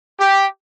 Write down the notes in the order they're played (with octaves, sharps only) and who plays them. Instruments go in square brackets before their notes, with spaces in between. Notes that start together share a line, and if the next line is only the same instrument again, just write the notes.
[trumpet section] G4